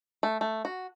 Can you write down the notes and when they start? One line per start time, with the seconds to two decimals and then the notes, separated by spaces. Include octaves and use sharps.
0.23 A3
0.41 A3
0.65 F#4